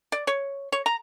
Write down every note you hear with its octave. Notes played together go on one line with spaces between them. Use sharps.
D5
C#5
C#5
A#5